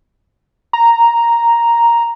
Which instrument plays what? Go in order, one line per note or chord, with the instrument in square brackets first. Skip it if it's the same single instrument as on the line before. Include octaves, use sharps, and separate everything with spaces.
[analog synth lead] A#5